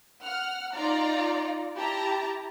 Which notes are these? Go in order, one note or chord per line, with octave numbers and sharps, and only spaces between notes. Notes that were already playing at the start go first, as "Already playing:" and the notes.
F#5 F6
D#4 F4 D5 A#5
E4 G4 A5 A#5